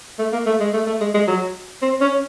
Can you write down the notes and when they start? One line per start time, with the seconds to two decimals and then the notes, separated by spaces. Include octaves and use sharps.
0.18 A3
0.32 A#3
0.46 A3
0.60 G#3
0.73 A3
0.86 A3
1.00 G#3
1.14 G#3
1.27 F#3
1.82 C4
2.01 C#4